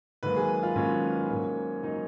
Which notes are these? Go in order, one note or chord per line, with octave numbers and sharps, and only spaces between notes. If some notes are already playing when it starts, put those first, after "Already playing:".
G#2 D#3 F#3 A#3 B4
G#4
F4
G#2 D#3 F#3 A#3 C#4
G#2 F#3 A#3
F#3 A#3 D#4